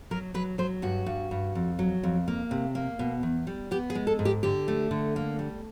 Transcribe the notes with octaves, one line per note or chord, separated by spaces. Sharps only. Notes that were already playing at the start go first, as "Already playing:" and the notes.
F#3 A#4
F#3 B4
F#3 C5
G2 F#4
G2
G2
F2
F#3
F2
A#3
C3
A#3
B2
E2
G3
B3 G4
G#4
G#3
A4
G#2
G4
D3 G4
A3
D3
A#3
G3